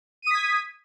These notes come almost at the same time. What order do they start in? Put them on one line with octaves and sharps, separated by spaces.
D#7 D#6 B6 G#6